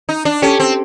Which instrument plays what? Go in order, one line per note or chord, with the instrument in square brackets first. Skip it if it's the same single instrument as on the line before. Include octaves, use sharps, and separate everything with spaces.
[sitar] D#4
D4
[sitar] C#4 [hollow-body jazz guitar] G4 A4
[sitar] C4